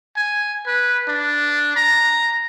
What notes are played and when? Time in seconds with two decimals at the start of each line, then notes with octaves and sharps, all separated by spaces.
0.17 G#5
0.67 B4
1.08 D4
1.76 A#5